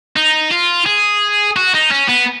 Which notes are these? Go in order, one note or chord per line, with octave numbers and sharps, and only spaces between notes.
D#4
F4
G#4
F#4
D#4
C#4
B3